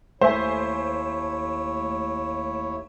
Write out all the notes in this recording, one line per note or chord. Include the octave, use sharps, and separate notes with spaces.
D#2 A3 E4 C5 C#5 E5 G#5